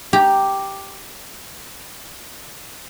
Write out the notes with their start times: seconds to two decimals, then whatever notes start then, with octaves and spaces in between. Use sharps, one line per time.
0.13 G4 A#5